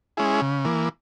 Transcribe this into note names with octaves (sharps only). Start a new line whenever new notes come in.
G#3 C#4 E4 G#4
C#3
E3 A#3